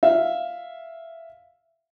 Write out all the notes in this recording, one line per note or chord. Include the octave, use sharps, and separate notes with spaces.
E5 F5